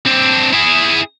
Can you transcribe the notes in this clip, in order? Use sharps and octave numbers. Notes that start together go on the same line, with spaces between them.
C4 D4
E4 G#4